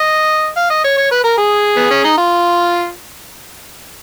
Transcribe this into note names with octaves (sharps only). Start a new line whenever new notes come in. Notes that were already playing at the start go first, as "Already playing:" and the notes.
Already playing: D#5
F5
D#5
C#5
C#5
B4
A#4
G#4
B3
C#4
D#4
F4